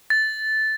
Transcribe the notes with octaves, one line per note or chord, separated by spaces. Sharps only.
A6